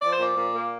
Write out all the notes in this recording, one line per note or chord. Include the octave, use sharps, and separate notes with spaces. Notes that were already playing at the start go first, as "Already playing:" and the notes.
F3 D5
C5
A#2 D5
A#2
A#3